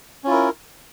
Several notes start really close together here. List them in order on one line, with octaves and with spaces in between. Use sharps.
C#4 F4 E4 A#4